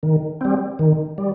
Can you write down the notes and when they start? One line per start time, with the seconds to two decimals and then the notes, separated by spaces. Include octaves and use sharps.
0.03 D#3
0.41 G3 C4
0.79 D#3
1.18 G3